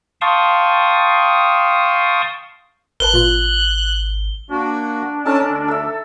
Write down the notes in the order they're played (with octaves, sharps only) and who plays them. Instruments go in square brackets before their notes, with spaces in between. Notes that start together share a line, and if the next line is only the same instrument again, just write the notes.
[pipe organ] F5 G5 A5 C6 C#6 D#6
[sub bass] G#1 [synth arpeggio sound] A#4 B4 A5 [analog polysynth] F#6 [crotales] G7
[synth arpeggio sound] A#2 F4
[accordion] A#3 F#4 [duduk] D4
[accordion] C#4 A5 [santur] D#4 A4 A#4
[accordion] D2
[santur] A4 E5